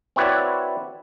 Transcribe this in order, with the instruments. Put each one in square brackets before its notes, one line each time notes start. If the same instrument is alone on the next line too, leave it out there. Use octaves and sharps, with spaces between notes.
[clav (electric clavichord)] C4 E4 F#4 B4 C#5 D5